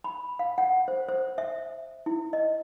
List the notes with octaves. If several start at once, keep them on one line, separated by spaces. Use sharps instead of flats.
B5
F5
F#5
C5
C5
E5
E4
D#5